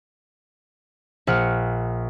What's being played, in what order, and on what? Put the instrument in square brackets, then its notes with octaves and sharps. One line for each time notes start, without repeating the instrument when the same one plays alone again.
[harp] A#1 F#5 F6 C#7